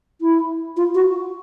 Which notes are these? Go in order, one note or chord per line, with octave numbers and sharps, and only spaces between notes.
E4
F4
F#4